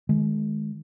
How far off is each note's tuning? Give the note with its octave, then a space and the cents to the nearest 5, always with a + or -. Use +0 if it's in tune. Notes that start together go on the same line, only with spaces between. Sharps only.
D#3 +0 G#3 +25